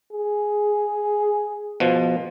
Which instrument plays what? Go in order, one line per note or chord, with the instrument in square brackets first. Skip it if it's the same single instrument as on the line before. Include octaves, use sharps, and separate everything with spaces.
[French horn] G#4
[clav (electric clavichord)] B2 F3